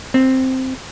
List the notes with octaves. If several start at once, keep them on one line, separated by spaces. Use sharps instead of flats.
C4